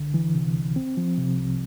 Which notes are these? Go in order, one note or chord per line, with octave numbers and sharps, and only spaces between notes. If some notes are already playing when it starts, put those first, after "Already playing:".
Already playing: C2 D3
E3
C3
C2
C4
F3
C3
C2